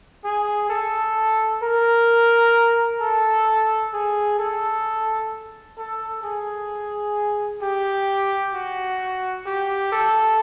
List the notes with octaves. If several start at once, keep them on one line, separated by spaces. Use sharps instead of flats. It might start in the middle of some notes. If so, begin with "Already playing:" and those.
G#4
A4
A#4
A4
G#4
A4
A4
G#4
G4
F#4
G4
A4